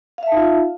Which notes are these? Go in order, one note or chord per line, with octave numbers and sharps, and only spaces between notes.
D#4 F4 E5 F5 A5